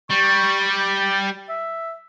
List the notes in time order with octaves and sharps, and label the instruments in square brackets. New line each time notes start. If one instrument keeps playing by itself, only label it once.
[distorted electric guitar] G3 [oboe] C#6
[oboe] G4
E5